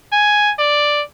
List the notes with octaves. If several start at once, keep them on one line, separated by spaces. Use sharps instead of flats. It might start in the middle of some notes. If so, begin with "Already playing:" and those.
G#5
D5